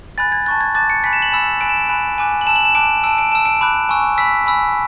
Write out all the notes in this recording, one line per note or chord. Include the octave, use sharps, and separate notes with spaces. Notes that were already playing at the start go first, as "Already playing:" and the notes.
G#5 B5 F#6 A6
G#6
A5 C#6 F#6 A6
G#6
A5 D6 F#6 A6
C#7
G#5 B5 F#6 B6
E7
F#7
G#5 B5 E6 E7
G#5 B5 F#6 D7
E7
D7
G#5 B5 F#6
G#5 D6 F#6
F#7
A5 E6 E7
F#7
E7
A5 D6 F#6 D7
A5 E6 D7
D7
A5 E6 E7
D7
B5 D6 F#6
G#5 C#6 E6
B5 E6 B6
G#5 B5 E6